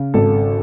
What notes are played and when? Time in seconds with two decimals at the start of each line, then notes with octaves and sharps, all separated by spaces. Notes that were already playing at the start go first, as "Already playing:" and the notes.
Already playing: C#3
0.14 G#1 A4